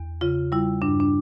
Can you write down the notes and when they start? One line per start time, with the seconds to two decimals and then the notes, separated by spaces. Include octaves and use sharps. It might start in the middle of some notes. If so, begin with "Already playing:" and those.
Already playing: E2
0.21 C#3 F4
0.52 G3 E4
0.82 G2 D4
1.00 D4